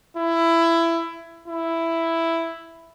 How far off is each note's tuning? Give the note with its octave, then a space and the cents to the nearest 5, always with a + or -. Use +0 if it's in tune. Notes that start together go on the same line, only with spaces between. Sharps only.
E4 +15
E4 +5